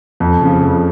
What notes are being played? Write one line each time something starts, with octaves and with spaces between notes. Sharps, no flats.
F2
C#3 F3
F2